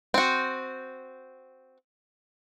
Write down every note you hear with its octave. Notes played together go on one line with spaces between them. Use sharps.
C4 F#4